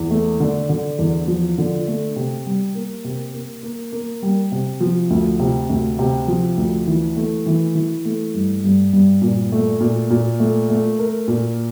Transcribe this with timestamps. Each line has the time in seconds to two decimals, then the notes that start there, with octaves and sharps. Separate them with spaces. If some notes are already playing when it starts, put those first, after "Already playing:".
Already playing: E2
0.11 A3
0.40 D3
0.69 D3
0.99 E2
1.27 F3
1.58 D3
1.87 A3
2.16 C3
2.46 G3
2.75 A#3
3.04 C3
3.34 A#3
3.63 A#3
3.92 A#3
4.22 G3
4.52 C3
4.80 F3
5.10 D2
5.39 C3
5.70 D2
5.99 C3
6.28 F3
6.57 D2
6.87 E3
7.16 A3
7.46 E3
7.75 E3
8.05 A3
8.34 G2
8.64 G2
8.93 G2
9.22 A#2
9.52 A3
9.81 A#2
10.11 A#2
10.40 A3
10.70 A3
10.99 A#4
11.28 A#2